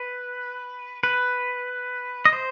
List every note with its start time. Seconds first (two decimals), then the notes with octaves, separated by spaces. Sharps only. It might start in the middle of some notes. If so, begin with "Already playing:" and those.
Already playing: B4
1.03 B4
2.25 D#5
2.33 C5